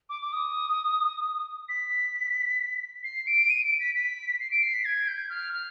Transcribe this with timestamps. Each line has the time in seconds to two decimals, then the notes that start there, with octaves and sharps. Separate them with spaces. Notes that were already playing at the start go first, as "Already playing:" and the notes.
0.10 D6
0.22 D6
0.33 D#6
1.69 B6
3.04 C7
3.27 D7
3.49 D#7
3.64 D7
3.80 B6
3.95 B6
4.40 C7
4.51 D7
4.62 C7
4.74 B6
4.85 G#6
5.08 G6
5.29 F6
5.53 F6